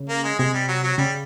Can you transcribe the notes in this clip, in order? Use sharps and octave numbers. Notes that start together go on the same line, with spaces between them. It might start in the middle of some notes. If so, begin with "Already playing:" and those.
Already playing: C#3
A#3
G#3
C3 G#3
G3
F#3
F#3
C#3 G3